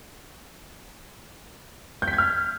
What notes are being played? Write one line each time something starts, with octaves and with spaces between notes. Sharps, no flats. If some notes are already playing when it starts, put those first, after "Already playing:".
G6
B6
G#6
F6